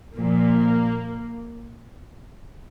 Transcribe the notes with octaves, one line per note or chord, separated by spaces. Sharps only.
A#2 F3 A#3